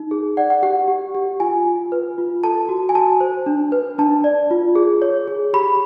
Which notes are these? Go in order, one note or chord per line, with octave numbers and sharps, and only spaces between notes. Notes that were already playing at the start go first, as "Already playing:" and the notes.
Already playing: D#4
G#4
D5 F#5
F#5
G4 F#5
G4
G4
F4 G#5
F4
B4
F4
A4 A5
F#4
G#5
F#4 A5
C5
D4
B4
D4 A5
D5
F4
G#4
C#5
G#4
G4 B5